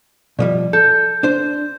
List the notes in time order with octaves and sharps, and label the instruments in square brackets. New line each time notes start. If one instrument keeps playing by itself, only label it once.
[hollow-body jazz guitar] B2 F3 G3 [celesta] D5
[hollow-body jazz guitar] A4 [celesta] G6
[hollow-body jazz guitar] D4 C5